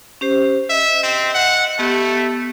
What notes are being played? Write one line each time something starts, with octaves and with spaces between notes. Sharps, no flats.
C#4 G4 C5
D#5 E5
C4
F#5
A3 B3 G4